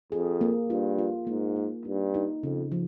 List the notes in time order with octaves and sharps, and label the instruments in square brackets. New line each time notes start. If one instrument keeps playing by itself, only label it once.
[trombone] F2 [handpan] G#4
[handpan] A#3
[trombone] G2 [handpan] F4
[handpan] F4
[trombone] G#2 [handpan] A#3
[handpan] A#3
[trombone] G2 [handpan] D#4
[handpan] D#4
[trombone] F2 [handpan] C#3
[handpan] F3